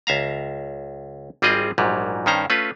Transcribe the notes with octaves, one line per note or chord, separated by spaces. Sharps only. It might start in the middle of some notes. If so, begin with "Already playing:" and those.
C#2 E5 F5 A#5
G#1 G3 C4 F4 G#4 D#5
A#1 G#2 F#3 G3
G2 D#3 C#4 C5 A#5
A3 C#4 F4 B4